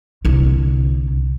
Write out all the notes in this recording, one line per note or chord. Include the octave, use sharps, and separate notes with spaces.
C2 D3